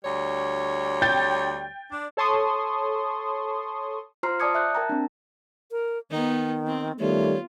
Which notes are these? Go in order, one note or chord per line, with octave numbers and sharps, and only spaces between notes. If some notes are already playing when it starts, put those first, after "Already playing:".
D2 G3 C#5
G5 G6 A6
D4
A4 C#5 A5 C6 C#6 D#6
F4 C5 A#5 C6 F6 C7
D5 A5 D6 D#6 G#6 C#7
E5 F#6 G6
A#4 G5 A5 A#5
C4 D4
A#4
D#3 B3 D#4
C4
D#3 G3 A3 B3 F4 C#5